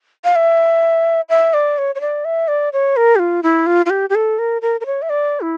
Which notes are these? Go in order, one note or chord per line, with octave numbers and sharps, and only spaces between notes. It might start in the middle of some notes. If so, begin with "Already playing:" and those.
F5
E5
E5
D5
C#5
C#5
D5
E5
D5
C#5
A#4
G4
F4
E4
F4
F4
G4
G4
A4
A#4
A#4
A#4
C#5
E5
D5
E4